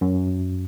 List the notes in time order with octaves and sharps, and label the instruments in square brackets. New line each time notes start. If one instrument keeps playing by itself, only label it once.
[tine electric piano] F#2